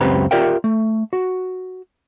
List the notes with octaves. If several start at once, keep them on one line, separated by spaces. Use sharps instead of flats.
C#2 F#2 C4 G4 B4 A#5
F4 G4 A#4 D5 E5 G5
A3
F#4